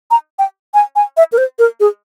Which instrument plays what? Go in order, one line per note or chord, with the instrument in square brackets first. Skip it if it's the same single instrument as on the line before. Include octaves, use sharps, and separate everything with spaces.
[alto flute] A#5
G5
G#5
G#5
E5
A#4
C5
A#4
G#4